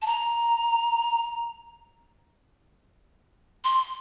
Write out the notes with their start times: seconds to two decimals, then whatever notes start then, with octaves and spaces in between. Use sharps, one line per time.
0.02 A5
0.06 A#5
3.64 C6